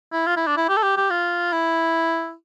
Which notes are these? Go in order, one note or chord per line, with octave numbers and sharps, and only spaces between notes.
E4
F4
E4
D4
E4
G4
A4
G4
G4
F4
E4